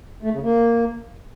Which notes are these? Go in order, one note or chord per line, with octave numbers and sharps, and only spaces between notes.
A3
C#3
A#3